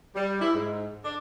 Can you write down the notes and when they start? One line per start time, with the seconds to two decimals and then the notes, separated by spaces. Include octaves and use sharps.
0.16 G3
0.42 E4
0.55 G#2
1.04 D4